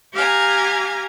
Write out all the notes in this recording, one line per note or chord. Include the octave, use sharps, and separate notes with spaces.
G4 F5 G#5 A#5